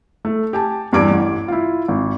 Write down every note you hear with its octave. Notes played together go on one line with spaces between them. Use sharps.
A3
G4 G#5 A5
E2 G2 G3 D6 G#6 D7
A1
E4 F4
G#1